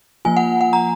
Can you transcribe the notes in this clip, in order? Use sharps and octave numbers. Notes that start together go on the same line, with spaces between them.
F3 A#3 F4 G#5
F#5
F#5
A#5